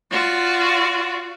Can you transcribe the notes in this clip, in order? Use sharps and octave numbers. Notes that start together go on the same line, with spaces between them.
F4 F#4 D5